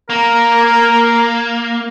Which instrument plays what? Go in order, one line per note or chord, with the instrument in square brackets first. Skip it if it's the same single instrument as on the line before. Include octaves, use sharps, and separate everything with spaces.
[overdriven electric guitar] A#3 [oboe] A#4